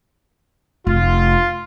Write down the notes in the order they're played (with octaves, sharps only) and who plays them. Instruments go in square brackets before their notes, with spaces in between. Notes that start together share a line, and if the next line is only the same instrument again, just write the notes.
[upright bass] F1 [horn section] F4